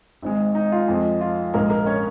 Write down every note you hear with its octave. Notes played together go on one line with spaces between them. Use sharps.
G#1 G#2 G#3
D#4
F4
F2 F3 G#3
F4
A#1 G#2 G#3 A#3 A#4
A#3 A#4
C#4 C#5